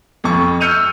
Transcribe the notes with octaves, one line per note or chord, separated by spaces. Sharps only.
F2 F3 C#6
E6 F6 G6 C#7 D#7 F7